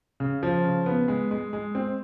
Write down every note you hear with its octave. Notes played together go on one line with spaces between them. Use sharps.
C#3
F3
C#3
B3
G#3
G#3
G#3
C4